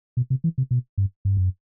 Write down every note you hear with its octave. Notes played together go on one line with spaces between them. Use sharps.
B2
C3
E3
C3
B2
G2
G2
F#2